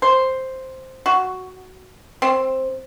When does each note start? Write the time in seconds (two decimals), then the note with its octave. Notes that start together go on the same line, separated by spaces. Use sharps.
0.02 C5
1.06 F#4
2.22 C4